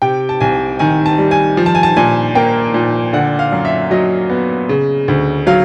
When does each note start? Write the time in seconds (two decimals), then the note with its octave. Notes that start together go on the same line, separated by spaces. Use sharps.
0.02 C3 G5
0.29 A5
0.41 C2 G#5
0.79 D#3 G#5
1.06 A5
1.18 G3
1.31 G#5
1.57 F3
1.66 A5
1.75 G#5
1.83 A5
1.96 A#2 G#5
2.35 A#3 G5
2.74 A#2
3.13 D3 F#5
3.39 F5
3.52 F#2
3.65 E5
3.91 F#3 D#5
4.30 B3
4.69 C#3
5.08 D2
5.47 F#3 F5